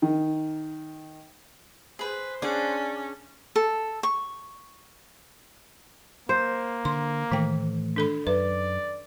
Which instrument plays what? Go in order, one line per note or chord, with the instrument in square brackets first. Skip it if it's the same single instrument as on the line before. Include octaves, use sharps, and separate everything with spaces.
[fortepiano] D#3
[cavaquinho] G#4 B4 [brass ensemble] C5
[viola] C#4 [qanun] D4 G#4 F#5 [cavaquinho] D5
[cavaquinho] A4
C#6
[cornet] A#3 [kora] C5
[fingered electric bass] D3 [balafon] C6
[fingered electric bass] A2 E3 A3 [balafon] D#3 G5
[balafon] D4 A4 B5
[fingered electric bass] F#2 [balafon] B4 [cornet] D5